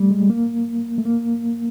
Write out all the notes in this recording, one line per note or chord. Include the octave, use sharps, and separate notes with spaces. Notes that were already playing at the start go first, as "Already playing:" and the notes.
Already playing: G3 A3
G#3
A#3
A3
A#3